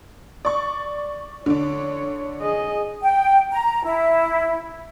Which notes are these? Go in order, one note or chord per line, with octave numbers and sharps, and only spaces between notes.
D5 C#6
D3 D4 C#5
G#4 D#5
G5
A#5
E4